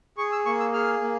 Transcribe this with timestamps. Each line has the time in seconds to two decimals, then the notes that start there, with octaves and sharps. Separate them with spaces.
0.17 G#4 C#6
0.32 E6
0.46 A#3 C#6
0.60 E6
0.73 G#4 F6
1.01 A#3